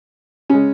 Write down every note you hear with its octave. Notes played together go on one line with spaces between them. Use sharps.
C#3 G#3 C#4